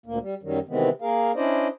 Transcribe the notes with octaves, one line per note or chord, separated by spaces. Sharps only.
D2 A#2 A#3
G3
F#2 D#3 F#3 G3
C3 D#3 E3 G#3 B3 C4
A#3 G#4 A#4 F5
C#4 D4 E4 C5 D5 D#5